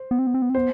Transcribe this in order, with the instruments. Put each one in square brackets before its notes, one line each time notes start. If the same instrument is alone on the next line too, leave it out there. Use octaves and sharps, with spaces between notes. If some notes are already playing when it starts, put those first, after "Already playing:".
Already playing: [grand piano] C5
[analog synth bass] B3
C4
B3
C4
B3
C4
[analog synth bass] B3 [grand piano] C5